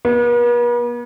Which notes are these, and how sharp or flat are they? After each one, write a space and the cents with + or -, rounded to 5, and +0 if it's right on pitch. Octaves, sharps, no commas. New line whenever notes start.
B3 -45